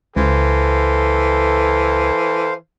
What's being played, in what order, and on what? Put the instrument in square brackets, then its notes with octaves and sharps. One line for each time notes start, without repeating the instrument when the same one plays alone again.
[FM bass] C#2 [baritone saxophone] E3 [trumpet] A4 [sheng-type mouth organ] C5 F5